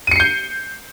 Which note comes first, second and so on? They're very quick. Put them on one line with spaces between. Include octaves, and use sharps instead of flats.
D#7 C#7 C7 G6